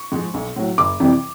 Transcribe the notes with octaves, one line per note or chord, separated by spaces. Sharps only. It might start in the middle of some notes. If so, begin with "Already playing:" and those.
Already playing: C#6
G#2 F3 G#3
B1
A2 F#3
F#1 D6
F2 C3 E3 G3